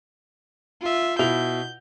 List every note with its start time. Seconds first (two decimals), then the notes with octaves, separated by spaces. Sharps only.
0.81 F4 E5
1.19 B2 E4 G6 F7